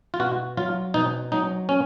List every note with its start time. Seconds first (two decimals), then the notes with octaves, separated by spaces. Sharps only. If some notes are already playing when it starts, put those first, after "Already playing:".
0.14 F4
0.20 B2 F#4
0.57 F#3 F4
0.94 B2 D#4
1.32 F#3 D#4
1.69 C#4